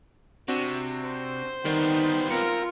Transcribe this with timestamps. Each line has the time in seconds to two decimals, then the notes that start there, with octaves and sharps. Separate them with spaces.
0.48 C3 C4 D4 F#4
1.05 C5
1.65 D#3 G3 B3 C4 D#4
2.30 C4 F4 A#4 C#7